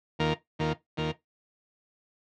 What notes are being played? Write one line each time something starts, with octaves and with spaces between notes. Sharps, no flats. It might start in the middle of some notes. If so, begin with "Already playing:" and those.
D#2 D#3 A#3 F4 A#4
D#2 D#3 A#3 F4 A#4
D#2 D#3 A#3 F4 A#4